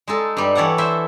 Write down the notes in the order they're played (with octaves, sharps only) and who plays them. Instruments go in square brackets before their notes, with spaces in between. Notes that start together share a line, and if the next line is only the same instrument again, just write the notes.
[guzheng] G#3 D#4 A4
G2 G3
E3 A4 C#5 D5 F#5
E4 C5 E5